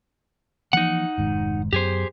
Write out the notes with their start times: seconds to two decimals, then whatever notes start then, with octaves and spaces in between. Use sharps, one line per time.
0.73 E3 F3 A#3 D#4 F#5
1.18 F1 G#2 D#3
1.73 F#2 F#3 B3 G4 G#4 C5